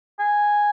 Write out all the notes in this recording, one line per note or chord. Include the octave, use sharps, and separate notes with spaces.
G#5